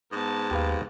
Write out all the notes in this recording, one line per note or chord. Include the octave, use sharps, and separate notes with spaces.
G#2 B3 A5
D#2 G4 B4 F5